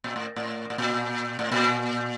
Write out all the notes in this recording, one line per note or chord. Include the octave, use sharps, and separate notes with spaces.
A#2
A2
A2
A2
A#2
A2
A#2